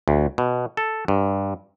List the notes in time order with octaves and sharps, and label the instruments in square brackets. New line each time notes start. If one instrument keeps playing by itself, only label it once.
[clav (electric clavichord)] D2
B2
A4
G2